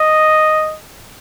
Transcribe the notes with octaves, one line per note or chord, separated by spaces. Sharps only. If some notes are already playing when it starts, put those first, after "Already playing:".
Already playing: D#5